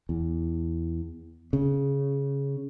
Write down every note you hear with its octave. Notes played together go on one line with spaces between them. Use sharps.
E2
C#3